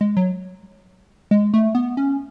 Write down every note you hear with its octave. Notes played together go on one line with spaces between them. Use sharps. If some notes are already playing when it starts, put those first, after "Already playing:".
G#3
F#3
G#3
A3
B3
C#4